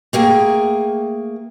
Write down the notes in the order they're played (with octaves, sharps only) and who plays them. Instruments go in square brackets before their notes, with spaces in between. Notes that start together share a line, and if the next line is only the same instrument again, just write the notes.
[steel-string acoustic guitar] A3 A#3 G#4 G5